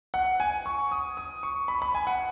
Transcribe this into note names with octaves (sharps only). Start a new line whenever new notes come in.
F#5
G#5
C#6
D#6
D#6
C#6
B5
B5
G#5
F#5